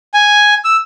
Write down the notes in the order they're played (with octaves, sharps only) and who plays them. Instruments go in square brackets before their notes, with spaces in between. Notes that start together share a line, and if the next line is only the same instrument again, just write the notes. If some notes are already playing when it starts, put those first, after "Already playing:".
[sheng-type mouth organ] G#5
E6